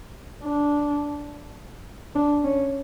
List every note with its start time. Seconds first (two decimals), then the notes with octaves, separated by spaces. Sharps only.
0.43 D4
2.15 D4
2.44 C#4